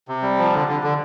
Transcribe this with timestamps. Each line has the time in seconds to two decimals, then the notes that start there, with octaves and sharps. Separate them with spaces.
0.08 C3
0.22 G3
0.38 F3
0.53 D3
0.68 D3
0.83 D3